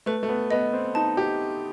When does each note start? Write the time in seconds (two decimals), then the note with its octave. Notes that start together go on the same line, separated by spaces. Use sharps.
0.06 A3 B4
0.23 A3
0.29 B3
0.51 B3 D#5
0.73 C4
0.95 D#4 A5
1.17 G4